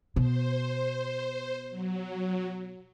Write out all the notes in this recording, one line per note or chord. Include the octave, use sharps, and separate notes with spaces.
B2 C5
F#3